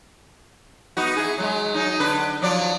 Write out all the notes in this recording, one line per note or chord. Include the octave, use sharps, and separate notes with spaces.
B3 D#4 F#4
E4 G#4
F#3 G#3
F#3 D#4
D3 B4
F3 F#3 D5